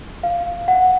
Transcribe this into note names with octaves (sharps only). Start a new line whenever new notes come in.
F5
F#5